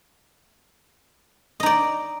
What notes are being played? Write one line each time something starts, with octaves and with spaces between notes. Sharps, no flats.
D#4 D5 D#5